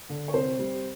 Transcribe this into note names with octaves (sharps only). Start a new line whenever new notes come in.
D3
C#5
C2 C4 C5
G3